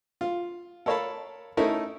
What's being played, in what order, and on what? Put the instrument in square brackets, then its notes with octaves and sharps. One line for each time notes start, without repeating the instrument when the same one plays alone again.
[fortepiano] F4
A4 A#4 C#5 F5 A5 B5
A3 C#4 D#4 E4 A4 A#4